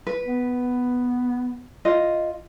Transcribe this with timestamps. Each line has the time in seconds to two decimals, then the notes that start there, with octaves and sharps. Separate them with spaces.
0.07 B4
0.25 B3
1.85 F4 D#5